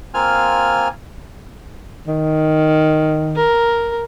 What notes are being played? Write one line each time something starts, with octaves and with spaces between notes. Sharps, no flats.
A#3 C4 F4 G#5 F6
D#3
A#4